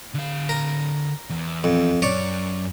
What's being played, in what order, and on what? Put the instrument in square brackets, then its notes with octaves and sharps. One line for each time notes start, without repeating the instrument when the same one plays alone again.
[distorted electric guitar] D3 F5
[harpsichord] A#4
[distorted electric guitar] E2
[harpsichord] F2
[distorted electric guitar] F#2 [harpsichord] C#5 D5